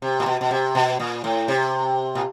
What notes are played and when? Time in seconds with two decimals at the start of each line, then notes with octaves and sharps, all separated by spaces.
0.02 C3
0.20 A#2
0.26 B2
0.41 B2
0.51 C3
0.75 B2
1.00 A#2
1.24 A2
1.48 C3
2.15 A#2